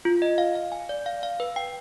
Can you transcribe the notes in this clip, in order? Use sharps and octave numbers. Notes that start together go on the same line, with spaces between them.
F4
D#5
F5
F5
G#5
D5
F5
F5
B4
G5